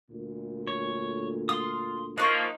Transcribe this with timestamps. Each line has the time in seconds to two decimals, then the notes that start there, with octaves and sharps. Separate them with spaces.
0.11 D2 A#2
0.67 C#5
1.49 F4 C6 D#6
2.18 F3 A#3 D#4 C#6 D6 F#6